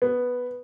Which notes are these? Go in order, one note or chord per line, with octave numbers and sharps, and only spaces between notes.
B3